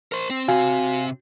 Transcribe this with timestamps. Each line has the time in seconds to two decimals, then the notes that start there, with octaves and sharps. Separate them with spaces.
0.12 A#4 C5
0.30 C4
0.48 C3 C4 F#4 F5 G#5